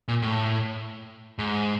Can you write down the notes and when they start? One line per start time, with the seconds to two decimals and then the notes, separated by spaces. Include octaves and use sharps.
0.08 A#2
0.22 A2
1.39 G#2